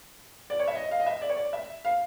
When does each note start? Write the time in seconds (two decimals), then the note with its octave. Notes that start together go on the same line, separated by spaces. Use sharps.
0.50 D5
0.60 C#5
0.68 E5
0.75 D#5
0.91 F5
1.00 D#5
1.06 E5
1.21 D5
1.29 C#5
1.37 D5
1.53 E5
1.85 F5